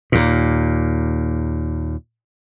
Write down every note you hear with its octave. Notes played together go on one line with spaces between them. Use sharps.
D#2 A#2